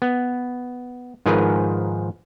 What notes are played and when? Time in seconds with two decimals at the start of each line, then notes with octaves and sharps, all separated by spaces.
0.02 B3
1.26 G#2 D#3 F3 G#4 A#4 B4